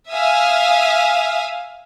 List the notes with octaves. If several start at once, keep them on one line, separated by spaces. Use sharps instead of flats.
E5 F5 G#5 D#6